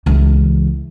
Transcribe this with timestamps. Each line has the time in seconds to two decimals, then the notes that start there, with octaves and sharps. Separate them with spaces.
0.06 C#2 E3